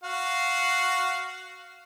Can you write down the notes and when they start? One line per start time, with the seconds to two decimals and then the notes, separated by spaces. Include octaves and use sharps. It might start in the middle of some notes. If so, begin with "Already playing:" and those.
0.03 F#4 F5